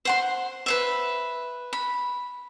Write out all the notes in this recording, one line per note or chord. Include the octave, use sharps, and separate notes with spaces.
C5 F#5 C6
B4 C5 E5
B5